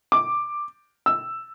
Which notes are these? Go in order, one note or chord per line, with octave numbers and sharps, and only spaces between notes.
D6
E6